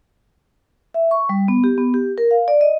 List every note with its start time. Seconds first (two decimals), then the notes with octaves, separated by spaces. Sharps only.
0.94 E5
1.11 C#6
1.29 G3
1.48 B3
1.64 G4
1.78 B3
1.94 G4
2.18 A#4
2.31 F5
2.48 D5
2.61 D#5